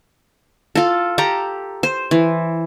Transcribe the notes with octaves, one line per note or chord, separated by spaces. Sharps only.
F4 A4
G4 A4 A#5
C5
E3